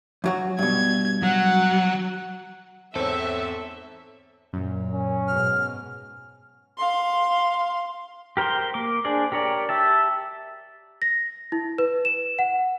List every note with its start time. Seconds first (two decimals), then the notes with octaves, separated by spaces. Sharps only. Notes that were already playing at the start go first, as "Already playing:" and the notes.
0.24 F#2 F#3 F#4
0.59 G2 B2 G#6
1.23 F#3 F#5
2.95 E2 G#2 C4 A4 C5 C#5 E5
4.53 F#2 A#2
4.93 C#4
5.27 G#2 B2 F6
6.78 F5 C6
8.37 G4 A#4 C5 G5 C6
8.74 A#3 D6
9.05 D4 G#4 C5 D5
9.32 G4 A#4 C#5 D5
9.69 G4 E5 A5
11.02 A#6
11.52 E4
11.78 B4
12.05 E7
12.39 F#5